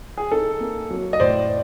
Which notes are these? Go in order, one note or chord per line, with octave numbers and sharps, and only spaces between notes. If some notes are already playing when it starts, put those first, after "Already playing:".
G#4
D#4 A4
A#3
F#3
D#5
A2 C5 D5